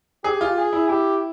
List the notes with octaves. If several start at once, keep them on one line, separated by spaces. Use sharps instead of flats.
G4 G#4
F4
G#4
E4
E4 G4